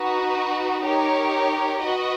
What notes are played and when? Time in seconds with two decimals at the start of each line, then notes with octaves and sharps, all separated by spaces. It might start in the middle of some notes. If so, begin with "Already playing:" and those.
Already playing: D#4 F#4 B4
0.84 D#4 G4 A#4 C#5
1.81 F#4 B4 D#5